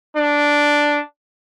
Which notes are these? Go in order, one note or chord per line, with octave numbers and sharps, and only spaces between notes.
D4